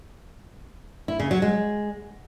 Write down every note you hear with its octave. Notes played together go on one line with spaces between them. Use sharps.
E4
C#3
F#3
G#3